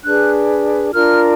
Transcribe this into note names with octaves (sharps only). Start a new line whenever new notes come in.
D4 G#4 B4 F#6
D4 F4 A#4 F6